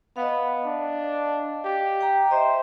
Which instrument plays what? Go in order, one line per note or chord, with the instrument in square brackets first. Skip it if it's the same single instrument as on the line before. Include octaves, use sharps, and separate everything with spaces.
[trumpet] B3 [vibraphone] D#5 F5
[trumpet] D4
G4
[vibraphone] G5 A#5
[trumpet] C5 [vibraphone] D#5 E5